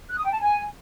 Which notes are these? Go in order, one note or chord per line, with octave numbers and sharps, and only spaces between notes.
F#6
D#6
G5
A5
G#5